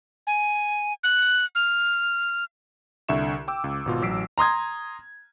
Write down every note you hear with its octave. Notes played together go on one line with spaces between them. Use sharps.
G#5
F#6
F6
C2 D3 E5 C#6 E7
G5 D6 E6
C#2
G#1 B2 F4
A1 F#3 E6 B6 C7 D7
A#5 C6 D#6 G#6